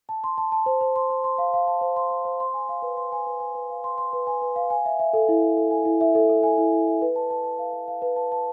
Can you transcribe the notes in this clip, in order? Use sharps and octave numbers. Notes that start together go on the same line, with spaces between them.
A5
C6
A5
A5
C5
C5
C6
C5
C6
F5
F5
A5
C5
C6
C5
C5
C6
G#5
F5
B4
C6
G#5
B4
G#5
B4
F5
C6
C6
B4
G#5
B4
F5
G#5
E5
E5
A4
E4
E5
A4
G#5
E4
E5
A4
A4
G#5
E4
E4
E5
B4
A5
A5
A5
F5
B4
F5
B4
A5
A5